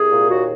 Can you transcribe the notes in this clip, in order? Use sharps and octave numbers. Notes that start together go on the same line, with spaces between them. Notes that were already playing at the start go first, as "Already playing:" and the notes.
Already playing: C2 G#4
A#2
D#2 F#4